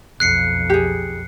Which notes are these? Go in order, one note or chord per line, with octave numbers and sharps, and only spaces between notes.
B1 F2 F#6 C7 C#7
G4 G#4